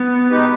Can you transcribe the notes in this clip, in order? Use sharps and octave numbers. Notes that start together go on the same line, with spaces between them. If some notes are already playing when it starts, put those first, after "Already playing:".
Already playing: B3
B2 G#3 D#4 G4 B4